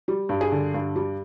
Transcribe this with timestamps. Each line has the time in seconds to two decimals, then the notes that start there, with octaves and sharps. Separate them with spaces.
0.08 G3
0.29 G2
0.41 G#4
0.52 D3
0.74 G2
0.96 G3